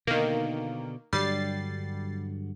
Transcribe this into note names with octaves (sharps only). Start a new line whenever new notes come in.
B2 D3 D#3 A#3
G2 D3 F#3 G3 A6 C7